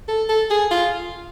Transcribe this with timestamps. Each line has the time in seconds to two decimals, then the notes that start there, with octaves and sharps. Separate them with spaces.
0.08 A4
0.29 A4
0.50 G#4
0.71 F4